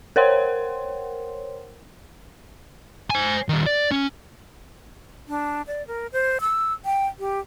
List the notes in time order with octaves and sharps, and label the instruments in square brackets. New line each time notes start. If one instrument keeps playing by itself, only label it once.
[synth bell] A#4 C5 C#5 F#5 G5 C6
[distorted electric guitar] C5 G#5
D#3 G3
D5
C#4
[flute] D4
D5
A#4
C5
E6
G5
G4